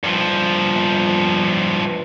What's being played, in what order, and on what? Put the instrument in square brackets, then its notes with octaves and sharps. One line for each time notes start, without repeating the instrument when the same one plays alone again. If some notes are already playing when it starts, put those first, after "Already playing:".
[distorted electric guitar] G2 F3